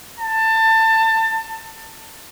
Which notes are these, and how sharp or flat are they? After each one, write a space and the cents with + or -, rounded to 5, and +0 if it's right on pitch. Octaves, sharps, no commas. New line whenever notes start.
A5 +25